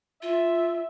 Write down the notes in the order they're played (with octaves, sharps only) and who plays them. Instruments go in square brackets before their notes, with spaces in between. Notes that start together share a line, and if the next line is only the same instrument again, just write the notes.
[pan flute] F4 [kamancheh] E5